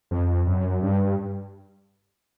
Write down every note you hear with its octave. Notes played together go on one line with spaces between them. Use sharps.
F2
F#2
G2